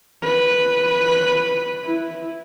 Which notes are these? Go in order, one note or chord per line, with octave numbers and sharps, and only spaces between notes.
B4
E4